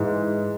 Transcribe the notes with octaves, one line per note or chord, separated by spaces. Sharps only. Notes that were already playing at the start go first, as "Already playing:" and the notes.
Already playing: G#2 E3 G#3